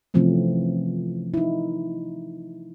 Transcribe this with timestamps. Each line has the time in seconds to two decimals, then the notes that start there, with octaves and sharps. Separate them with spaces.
0.14 C3 E3 F3 A3 C4 C#4
1.34 D#4 E4